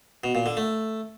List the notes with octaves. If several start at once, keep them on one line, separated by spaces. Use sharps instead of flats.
B2
A#2
D3
A3